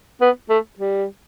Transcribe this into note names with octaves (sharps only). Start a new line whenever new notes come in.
B3
A3
G3